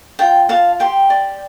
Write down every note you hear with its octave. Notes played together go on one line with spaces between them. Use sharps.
F4 G5
F4 F5 A5
G4 G5 C6
D5